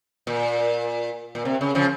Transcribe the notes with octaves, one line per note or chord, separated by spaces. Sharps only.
A#2
A#2
C3
C#3
C#3 F3